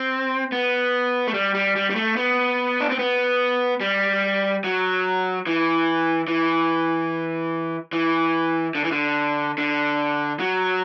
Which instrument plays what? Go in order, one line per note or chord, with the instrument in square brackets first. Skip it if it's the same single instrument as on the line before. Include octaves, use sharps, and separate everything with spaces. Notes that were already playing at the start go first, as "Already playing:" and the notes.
Already playing: [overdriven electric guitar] C4
B3
A3
G3
G3
G3
G3
A3
B3
D4
C4
B3
G3
F#3
E3
E3
E3
D3
E3
D3
D3
F#3